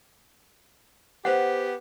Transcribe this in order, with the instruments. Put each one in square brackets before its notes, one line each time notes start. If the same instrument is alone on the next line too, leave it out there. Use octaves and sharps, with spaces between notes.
[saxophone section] B3 G4 [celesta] C5 F#5